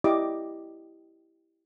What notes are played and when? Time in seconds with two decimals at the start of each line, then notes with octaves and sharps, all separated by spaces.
0.04 E4 G4 D5 D#5 D6